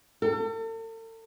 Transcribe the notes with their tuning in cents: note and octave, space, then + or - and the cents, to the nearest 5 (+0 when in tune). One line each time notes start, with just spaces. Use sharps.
A4 +40